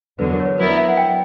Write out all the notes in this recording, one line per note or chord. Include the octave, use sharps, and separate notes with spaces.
E2 D3 F#3 B4
A#4
C#5
B4
F#3 B3 E4 A#4 B4
D5
E5
F#5
G5